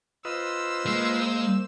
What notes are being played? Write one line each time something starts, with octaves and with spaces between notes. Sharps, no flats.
F4 B4 C5 D#5 E6
G#3 A#3